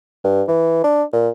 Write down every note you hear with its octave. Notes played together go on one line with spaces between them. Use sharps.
G2
E3
D4
A#2